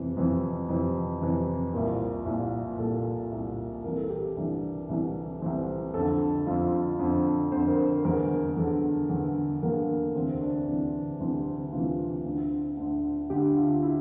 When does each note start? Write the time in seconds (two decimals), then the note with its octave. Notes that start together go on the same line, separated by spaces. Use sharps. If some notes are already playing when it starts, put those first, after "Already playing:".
Already playing: F2 C3 E3
0.17 F2 C3 E3
0.69 F2 C3 E3
1.21 F2 C3 E3
1.74 C2 A#2 A#4
2.26 C2 A#2
2.78 C2 A#2 A4
3.32 C2 A#2
3.84 C2 C3 E3 A#4
3.97 A4
4.10 G4
4.37 C2 C3 E3 D4
4.89 C2 C3 E3
5.41 C2 C3 E3 C4
5.94 F2 D3 A4
6.47 F2 D3 F4
6.99 F2 D3
7.52 F2 D3 C5
7.68 A#4
7.79 C5
8.05 E2 D3 A#4
8.57 E2 D3 A4
9.09 E2 D3
9.62 E2 D3 A#3
10.15 D2 C3 E3 C4
10.41 D4
10.67 D2 C3 E3
11.20 D2 C3 E3
11.72 D2 C3 E3 F4
12.25 D2 D3
12.77 D2 D3
13.30 D2 D3 G4
13.57 F4
13.83 E4